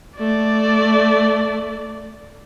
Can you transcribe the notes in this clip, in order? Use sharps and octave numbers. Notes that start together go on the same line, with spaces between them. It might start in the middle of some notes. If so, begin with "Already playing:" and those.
A3 D5